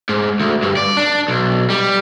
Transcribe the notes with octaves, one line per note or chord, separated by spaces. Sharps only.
G#2
D2
G2
D5
D4
B1
G3